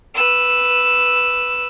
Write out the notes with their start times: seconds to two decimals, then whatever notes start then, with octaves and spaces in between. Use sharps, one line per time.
0.15 B4 E6